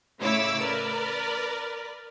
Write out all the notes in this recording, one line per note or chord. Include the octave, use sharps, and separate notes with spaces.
A2 C#3 E4 C#5 D6 E6
A#4 B4 D5